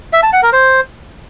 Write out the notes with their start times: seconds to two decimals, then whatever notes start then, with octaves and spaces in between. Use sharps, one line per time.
0.13 E5
0.23 A5
0.33 F#5
0.43 A#4
0.53 C5